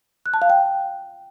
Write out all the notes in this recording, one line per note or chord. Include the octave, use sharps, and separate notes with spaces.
F#6
A5
F5
G5